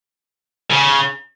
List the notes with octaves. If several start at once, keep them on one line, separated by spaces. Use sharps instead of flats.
C#3